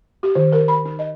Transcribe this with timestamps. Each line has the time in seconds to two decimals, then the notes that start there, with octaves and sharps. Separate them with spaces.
0.23 G4
0.35 D#3
0.53 A#4
0.68 B5
0.85 D#4
0.99 D#5